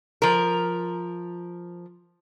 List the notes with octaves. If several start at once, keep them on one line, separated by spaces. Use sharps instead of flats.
F3 A#4